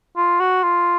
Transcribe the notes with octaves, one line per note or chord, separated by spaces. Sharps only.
F4
F#4
F4